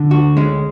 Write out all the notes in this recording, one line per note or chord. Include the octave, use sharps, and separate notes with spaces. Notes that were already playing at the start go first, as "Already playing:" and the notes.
Already playing: D3
D2 F#4
G#3 C#4